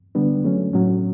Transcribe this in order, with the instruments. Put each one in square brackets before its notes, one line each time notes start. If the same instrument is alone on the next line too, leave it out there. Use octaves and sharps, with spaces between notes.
[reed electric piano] D3 G3 B3 D4
F#3 A3 C#4
A2 F#3 C#4